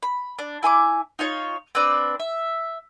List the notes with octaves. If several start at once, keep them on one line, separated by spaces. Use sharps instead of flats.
B5
D4
E4 G#5 C6 D6
D#4 F4 C#5
C4 D4 B4 D5
E5